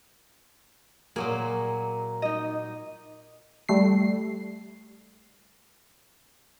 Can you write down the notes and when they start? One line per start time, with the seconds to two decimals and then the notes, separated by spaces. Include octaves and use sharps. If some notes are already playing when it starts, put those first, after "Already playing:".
1.16 A#2 F#3 A#3 G#4
2.22 D#4 D#5
3.69 G3 A3 C7